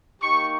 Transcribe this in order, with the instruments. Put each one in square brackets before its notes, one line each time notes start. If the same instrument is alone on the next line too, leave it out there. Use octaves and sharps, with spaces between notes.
[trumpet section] A#3 D#4 G4 C#6